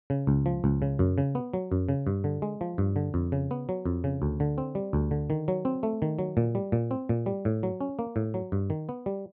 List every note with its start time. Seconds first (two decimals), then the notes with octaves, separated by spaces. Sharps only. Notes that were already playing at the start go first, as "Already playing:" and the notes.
0.10 C#3
0.27 C#2
0.46 F3
0.64 C#2
0.82 C#3
0.99 F#2
1.18 C#3
1.35 B3
1.54 F#3
1.72 F#2
1.89 C#3
2.07 G2
2.24 D3
2.42 G#3
2.61 F3
2.78 G2
2.96 D3
3.14 F2
3.32 C#3
3.51 B3
3.69 F#3
3.85 F2
4.04 C#3
4.22 D2
4.40 D3
4.58 C4
4.75 G3
4.93 D2
5.11 D3
5.30 D#3
5.48 F#3
5.65 C4
5.83 A3
6.02 D#3
6.19 F#3
6.37 A#2
6.55 G3
6.72 A#2
6.91 C4
7.09 A#2
7.26 G3
7.45 A2
7.63 F#3
7.81 C#4
7.99 A#3
8.16 A2
8.34 F#3
8.52 G2
8.70 D#3
8.89 B3
9.06 G3